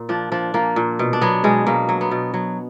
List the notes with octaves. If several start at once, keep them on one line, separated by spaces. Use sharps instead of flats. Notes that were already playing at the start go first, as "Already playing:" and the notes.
Already playing: A#2
F3 D4
F3 D4
F3 A#3
A#2
B2
D4
F#3 B3
B2 G#3
B2 A#3
F#3
B3
B2
F#3